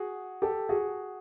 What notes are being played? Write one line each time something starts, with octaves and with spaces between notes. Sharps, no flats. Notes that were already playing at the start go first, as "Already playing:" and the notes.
Already playing: F#4 G#4
G4 A4
F#4 G#4